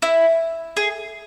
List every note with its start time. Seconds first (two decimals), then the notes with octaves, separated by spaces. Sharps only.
0.02 E4
0.77 G#4